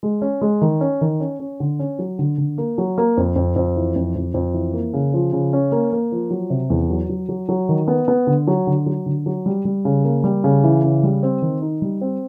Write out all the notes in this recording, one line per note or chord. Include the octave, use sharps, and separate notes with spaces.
G#3
C#4
G#3
D#3
C#4
D#3
C#4
C#4
D3
C#4
F#3
D3
D3
A#3
F#3
A#3
F2
F2
F2
E3
F2
F2
F2
E3
A#3
C#3
F3
C#3
C#4
A#3
A#3
F3
F#3
C3
E2
F#3
F#3
F#3
F#3
D#3
B3
B3
D3
F#3
D3
F#3
D3
F#3
G3
G3
C#3
A#3
G3
C#3
E3
C#3
G3
C4
D#3
D#4
G3
C4